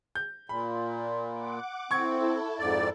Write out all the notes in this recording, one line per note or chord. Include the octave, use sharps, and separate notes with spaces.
G6
A#2 B5
F#5 D6
C4 E4 A4 C#6 G#6
F2 G#2 D5